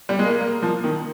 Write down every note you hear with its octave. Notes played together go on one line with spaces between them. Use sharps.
G3
G#3
A#3
A#3
F3
D#3